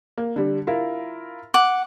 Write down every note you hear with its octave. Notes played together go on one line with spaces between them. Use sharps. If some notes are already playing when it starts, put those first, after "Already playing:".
A#3
D3 G3
E4 F4 A#4
F#5 D6